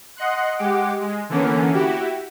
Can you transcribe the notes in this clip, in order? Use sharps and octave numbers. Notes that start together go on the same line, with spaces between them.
D#5 F#5 C6 F#6
G#3 G4 F#5 D6
G#3
D3 E3 A#3 B3 C#4
E4 F#4 G4